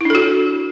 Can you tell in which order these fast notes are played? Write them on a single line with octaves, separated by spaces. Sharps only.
E4 D4 A4 F#4